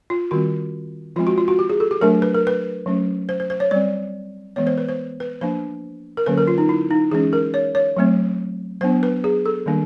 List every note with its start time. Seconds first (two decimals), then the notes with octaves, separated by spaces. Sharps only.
0.10 F4
0.31 D#3 G3 C4 F#4
1.16 F3 G#3 C4 F4
1.27 F#4
1.38 F4
1.48 F#4
1.59 G4
1.70 G#4
1.80 A4
1.91 G4
2.01 F#3 A3 D4 A#4
2.22 B4
2.35 A#4
2.47 B4
2.86 F#3 A3 C#4
3.29 C5
3.40 C5
3.50 C5
3.60 C#5
3.71 G3 C4 D5
4.56 E3 G#3 B3 C#5
4.67 C5
4.78 B4
4.89 C5
5.20 B4
5.41 F3 A#3 D4 C5
6.17 A#4
6.26 D3 F#3 A#3 C#4 B4
6.38 A#4
6.48 F4
6.58 D#4
6.69 E4
6.90 D#4
7.11 E3 G#3 C#4 G#4
7.33 A#4
7.54 C#5
7.75 C#5
7.97 F#3 A3 C4
8.81 F#3 B3 D4 C5
9.03 B4
9.24 G#4
9.46 A4
9.66 D#3 G3 A#3 D4